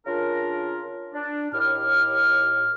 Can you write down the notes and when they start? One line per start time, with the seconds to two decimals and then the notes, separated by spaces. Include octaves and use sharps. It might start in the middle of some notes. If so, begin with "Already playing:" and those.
0.06 C#3 D4 F4 A#4
1.14 D4
1.53 D#2 A2 G4 F6